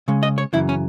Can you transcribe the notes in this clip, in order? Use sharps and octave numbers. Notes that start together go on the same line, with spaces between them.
C#3 G#3 C#4
D#5
C#5
F#2 C#3 E3 E4
C#4